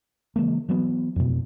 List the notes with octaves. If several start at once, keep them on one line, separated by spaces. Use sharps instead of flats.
C#3 E3 G#3 A#3
E3 F#3 B3
F2 B2